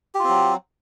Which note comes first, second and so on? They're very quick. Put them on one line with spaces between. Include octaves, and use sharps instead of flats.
G4 F4 C4 F#3